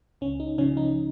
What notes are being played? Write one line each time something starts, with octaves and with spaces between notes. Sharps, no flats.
C#2 C#4
D#4
C#3 F3 C#4
D#4